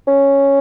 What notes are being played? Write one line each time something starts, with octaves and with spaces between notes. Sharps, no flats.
C#4